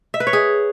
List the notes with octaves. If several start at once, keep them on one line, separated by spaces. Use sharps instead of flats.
E5
B4
C#5
G#4